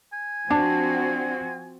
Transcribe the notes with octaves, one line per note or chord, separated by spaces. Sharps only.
G#5
F3 C4 D4 F#4 A5